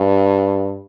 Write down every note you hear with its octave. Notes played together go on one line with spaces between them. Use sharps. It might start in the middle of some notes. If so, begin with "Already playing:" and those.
Already playing: G2